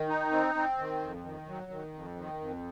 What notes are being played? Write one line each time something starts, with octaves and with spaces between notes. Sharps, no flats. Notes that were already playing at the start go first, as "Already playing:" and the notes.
Already playing: D#3
D#4
C4
C4
D#3
F2
D#3
F#3
D#3
F2
D#3
F2